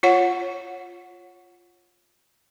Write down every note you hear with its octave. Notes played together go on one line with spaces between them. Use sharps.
F4 C#5 F#5